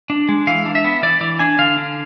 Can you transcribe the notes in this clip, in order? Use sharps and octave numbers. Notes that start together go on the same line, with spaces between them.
D4
G#3
E3 F5
D4
E5
B3
E3 D5
E3 D5
D4 G#5
D3 F5
D4